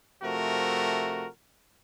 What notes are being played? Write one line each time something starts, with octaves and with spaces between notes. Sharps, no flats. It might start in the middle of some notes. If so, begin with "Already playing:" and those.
C3 F3 A3 F#4 A#4